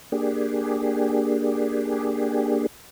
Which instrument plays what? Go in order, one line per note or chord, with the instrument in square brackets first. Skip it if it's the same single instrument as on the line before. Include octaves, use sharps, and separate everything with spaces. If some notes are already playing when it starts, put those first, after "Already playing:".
[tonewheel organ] A#3 D4 G4 G#4